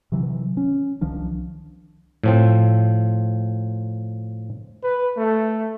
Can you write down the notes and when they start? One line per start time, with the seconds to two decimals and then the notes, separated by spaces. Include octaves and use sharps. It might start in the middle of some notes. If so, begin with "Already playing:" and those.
0.12 C3 D#3 E3 F#3
0.57 C#4
1.01 C2 D#3 F3 D4
2.24 A2 F3 C4
4.83 B4
5.17 A3